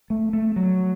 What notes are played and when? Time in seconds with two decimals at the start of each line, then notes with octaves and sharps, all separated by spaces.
0.10 A3
0.33 A3
0.56 F#3